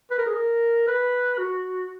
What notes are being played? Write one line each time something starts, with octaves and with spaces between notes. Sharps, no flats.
B4
A#4
G#4
A#4
B4
F#4